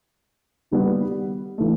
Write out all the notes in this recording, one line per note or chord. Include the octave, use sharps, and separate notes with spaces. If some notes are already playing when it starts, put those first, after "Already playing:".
D#3 G3 B3
E3 A3